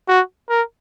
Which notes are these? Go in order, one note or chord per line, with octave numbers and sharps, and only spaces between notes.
F#4
A#4